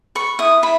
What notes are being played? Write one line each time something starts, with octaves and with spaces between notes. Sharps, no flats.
B4 C#6
E4 D#6
E4 B5